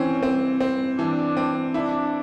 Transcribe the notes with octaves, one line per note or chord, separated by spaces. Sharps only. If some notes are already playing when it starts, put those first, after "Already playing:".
Already playing: E3 C4 C#4
C4
C4
E3 D4
C4
D4 E4